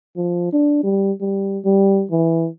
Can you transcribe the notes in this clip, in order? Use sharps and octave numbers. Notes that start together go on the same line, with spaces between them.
F3
D4
G3
G3
G3
E3